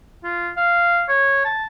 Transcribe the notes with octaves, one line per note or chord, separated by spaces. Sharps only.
F4
F5
C#5
A5